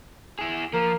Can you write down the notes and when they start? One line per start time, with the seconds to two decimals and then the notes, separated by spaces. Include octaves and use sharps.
0.39 E4 G#4
0.74 F3 A#3